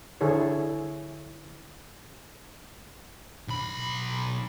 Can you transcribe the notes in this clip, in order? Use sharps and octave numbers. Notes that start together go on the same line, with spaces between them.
D3 E4 G#4 A4 C#5
B1 B5